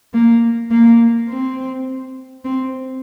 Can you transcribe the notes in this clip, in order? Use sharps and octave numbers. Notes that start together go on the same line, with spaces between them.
A#3
A#3
C4
C4